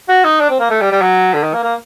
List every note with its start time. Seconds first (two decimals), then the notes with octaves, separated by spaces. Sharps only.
0.09 F#4
0.24 D#4
0.40 D4
0.50 C4
0.60 A#3
0.70 A3
0.81 G3
0.92 G3
1.01 F#3
1.34 D3
1.43 D#3
1.53 A#3
1.64 A#3